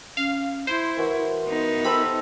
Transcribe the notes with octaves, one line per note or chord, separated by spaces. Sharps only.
C#4 F5
E4 C5
E3 F#4 A#4
B3 D#4
G4 A4 C5 B5